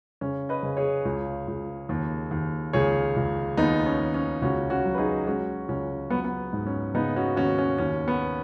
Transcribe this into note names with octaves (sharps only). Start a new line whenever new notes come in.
C#3 C#4
B4 D#5
C#3
G#4 C#5
C#2
C#2
D#2
D#2
C#2 G#4 C#5
C#2
D#2 B3 D#4
C#4
D#2
C#4
C#2 C#4 F#4
C#4 F#4
F#3
B4
D#4 G#4
G#3 C#4 F#4
C#2 C#4
F#3 B3
B3
G#2
C#4
C#3 B3 D#4
C#4 F#4
D#2 C#4 F#4
C#4
D#2 C#4
B3